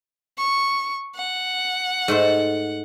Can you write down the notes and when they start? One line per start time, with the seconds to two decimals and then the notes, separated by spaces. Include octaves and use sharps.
0.38 C#6
1.16 F#5
2.08 G#2 A3 C5